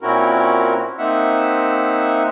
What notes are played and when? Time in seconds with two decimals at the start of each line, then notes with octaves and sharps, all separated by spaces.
0.01 A#2 C4 C#4 E4 F#4 A#4
0.98 A#3 C4 D#4 E5 F#5